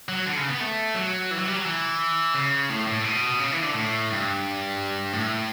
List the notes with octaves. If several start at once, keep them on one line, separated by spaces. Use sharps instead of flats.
F#3
D3
C#3
B3
A3
F#3
E3
F#3
G3
F#3
E3
C#3
A2
A2
B2
C#3
E3
D3
A2
G2
A2